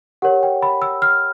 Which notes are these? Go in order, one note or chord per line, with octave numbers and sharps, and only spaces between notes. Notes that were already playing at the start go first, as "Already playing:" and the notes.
G4 A#4 C#5 F#5
G5
B5
E6
F6